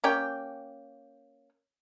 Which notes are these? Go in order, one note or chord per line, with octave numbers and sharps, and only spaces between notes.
A#3 C#4 G4 G5